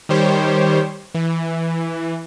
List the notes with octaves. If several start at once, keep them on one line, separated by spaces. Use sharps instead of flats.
D#3 G3 G4 C5 C#5
E3